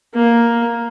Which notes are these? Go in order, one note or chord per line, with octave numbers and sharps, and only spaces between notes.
A#3